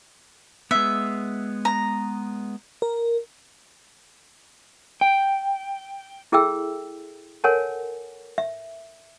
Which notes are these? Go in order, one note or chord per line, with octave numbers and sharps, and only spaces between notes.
G#3 B3 E5
A#5
A#4
G5
E4 G#4 A4 E5 G5 E6
A4 A#4 C#5 F#5 G#5 A5
E5